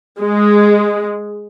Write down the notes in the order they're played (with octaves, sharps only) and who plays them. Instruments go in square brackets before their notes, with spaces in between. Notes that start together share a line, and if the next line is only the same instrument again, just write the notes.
[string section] G#3